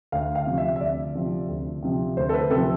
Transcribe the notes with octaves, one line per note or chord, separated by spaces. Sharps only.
D2 F5
F5
C3 F3
E5
E5
D2 D5
C3 F3
D2
C3 F3
D2 C5
A4
B4
C3 F3 A4